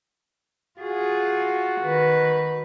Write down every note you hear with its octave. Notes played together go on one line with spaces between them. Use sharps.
F4 F#4 G#4
D#3 B4